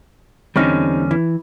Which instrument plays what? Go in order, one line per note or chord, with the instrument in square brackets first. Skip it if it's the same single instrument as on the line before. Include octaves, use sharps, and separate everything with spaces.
[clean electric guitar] E2 D3 C#4 [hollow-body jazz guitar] G3 C4 D#4
[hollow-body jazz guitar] E3